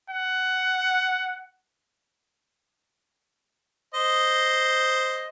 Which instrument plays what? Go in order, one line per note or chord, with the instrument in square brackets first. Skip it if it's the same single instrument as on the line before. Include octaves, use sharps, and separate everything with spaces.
[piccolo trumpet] F#5
[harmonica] C5 D#5